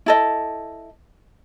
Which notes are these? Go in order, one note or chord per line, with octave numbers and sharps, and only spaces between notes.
E4 A4 D#5